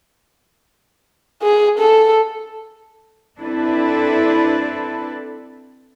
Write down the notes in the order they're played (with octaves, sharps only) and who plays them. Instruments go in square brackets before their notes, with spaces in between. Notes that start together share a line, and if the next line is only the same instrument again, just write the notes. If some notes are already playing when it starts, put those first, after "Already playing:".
[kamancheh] G#4
A4
[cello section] C4 D4 E4 A4 B4